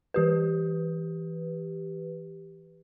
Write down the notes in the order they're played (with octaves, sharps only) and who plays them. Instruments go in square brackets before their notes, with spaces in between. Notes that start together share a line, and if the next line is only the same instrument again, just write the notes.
[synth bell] E3 G4 B4